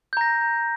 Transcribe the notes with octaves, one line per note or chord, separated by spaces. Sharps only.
A#5 G6 A#6